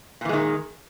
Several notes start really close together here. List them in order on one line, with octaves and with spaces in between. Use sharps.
A#2 E3 G#3 D#3